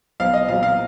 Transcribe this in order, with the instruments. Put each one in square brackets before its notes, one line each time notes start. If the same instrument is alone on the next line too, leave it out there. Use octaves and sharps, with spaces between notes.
[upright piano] B1 F5
D#5
A#2 F#3 F5
F5